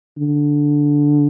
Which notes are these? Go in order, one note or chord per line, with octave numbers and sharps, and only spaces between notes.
D3